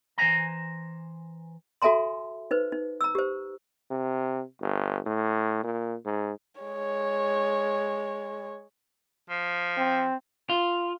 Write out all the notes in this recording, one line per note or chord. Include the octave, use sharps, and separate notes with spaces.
E3 C5 E5 G#5 A#5
F#4 A4 E5 G#5 A#5 C6
D#4 B4 C5
D#4
A#5 E6
G4 C5
C3
G1
A2
A#2
G#2
G#3 C#5
F3
C4
F4